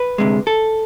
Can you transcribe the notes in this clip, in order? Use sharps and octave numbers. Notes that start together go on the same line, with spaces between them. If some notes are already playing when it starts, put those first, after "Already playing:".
Already playing: B4
D2 C3 G#3
A4